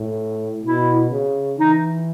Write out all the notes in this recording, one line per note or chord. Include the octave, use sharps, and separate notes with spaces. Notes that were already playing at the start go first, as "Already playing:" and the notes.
Already playing: A2
B2 E4
C#3
E3 D#4